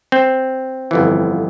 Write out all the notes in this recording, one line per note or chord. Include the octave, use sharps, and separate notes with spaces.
C4
G1 F2 E3